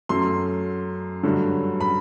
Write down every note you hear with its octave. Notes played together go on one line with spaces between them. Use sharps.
F#2 F#3 A3 C6
G2 D3 F#3 A3
B5